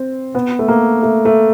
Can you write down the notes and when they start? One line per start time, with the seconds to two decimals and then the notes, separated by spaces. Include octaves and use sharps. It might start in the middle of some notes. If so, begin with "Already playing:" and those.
Already playing: C4
0.35 B3
0.59 A3
0.68 A#3
1.03 A3
1.25 A3